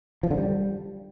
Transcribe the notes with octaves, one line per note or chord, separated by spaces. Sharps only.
F3
D3
G3